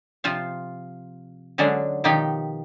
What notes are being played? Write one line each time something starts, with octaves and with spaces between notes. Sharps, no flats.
C3 F3 F4 C5 F5
D3 F#3 G#3 C#4 D4
B2 D#3 F3 D#4 G4